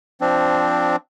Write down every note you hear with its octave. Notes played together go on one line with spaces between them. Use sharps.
F3 C4 D4